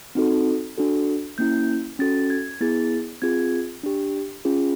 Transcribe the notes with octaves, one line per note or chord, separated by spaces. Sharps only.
C4 D#4 F#4 A4
D4 F#4 A4
A#3 C#4 E4 G6
C#4 F#4 A4 A6
G#6
B3 E4 G#4 A6
C4 F4 G#4 G#6
D4 G4
C#4 F4 G#4